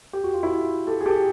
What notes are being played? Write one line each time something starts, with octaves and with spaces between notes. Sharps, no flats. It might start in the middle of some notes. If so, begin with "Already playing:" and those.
G4
F#4
F4
E4 F#4
G4 A4
G#4
G4 A4